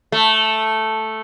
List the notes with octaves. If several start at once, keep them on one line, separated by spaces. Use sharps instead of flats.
A3